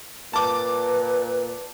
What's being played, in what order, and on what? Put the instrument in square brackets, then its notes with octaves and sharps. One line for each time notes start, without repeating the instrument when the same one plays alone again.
[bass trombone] A#2 [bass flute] B4 [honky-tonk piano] A5 D6